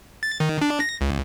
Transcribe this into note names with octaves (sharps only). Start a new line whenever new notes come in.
A6
D#3
D4
A#6
C#2